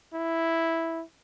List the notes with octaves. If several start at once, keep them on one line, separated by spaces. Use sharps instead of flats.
E4